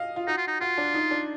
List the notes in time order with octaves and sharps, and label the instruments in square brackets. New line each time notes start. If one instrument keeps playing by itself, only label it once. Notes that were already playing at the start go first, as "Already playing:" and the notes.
Already playing: [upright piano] D#5 F5
F4
[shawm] D#4 [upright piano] F#4
[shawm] F4
D#4
[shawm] F4 [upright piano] F#4
[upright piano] D4
D#4
D4